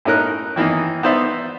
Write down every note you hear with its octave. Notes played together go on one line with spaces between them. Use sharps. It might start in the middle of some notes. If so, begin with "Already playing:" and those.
A2 C#4 D#4 A#4 F#6
D#3 E3 A#3 D#4
B3 D#4 C5 D5 E5